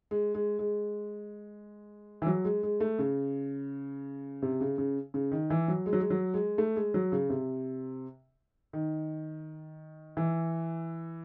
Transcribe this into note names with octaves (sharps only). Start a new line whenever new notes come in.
G#3
G#3
G#3
E3
F#3
G#3
G#3
A3
C#3
C3
C#3
C#3
C#3
D#3
E3
F#3
G#3
F#3
G#3
F#3
G#3
A3
G#3
F#3
C#3
C3
D#3
E3